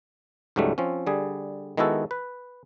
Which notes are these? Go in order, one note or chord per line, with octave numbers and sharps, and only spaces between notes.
C#2 G#2 F#3 G3 A3
F3 C4 C#4
D3 G3 G#4
D#3 G#3 B3 E4 F#4 A4
B4